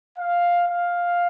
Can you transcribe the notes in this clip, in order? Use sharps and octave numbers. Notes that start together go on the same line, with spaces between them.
F5
F5